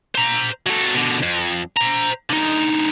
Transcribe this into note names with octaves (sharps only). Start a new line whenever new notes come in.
C5 A#5
F#3 A4
B2 D3
F2
C5 A#5
D3 D#4